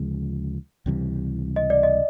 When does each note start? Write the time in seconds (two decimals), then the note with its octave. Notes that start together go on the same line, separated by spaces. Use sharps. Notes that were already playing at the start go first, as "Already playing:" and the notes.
Already playing: D2 C#3 F3 G#3
0.86 C#2 C3 E3 G3
1.56 D#5
1.70 D5
1.83 D#5